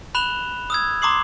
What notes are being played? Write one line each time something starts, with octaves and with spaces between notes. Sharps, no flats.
B5 F#6 E7 F7 G7
D#6 E6 G#6
A#5 C6 D6 D#6 C7 F#7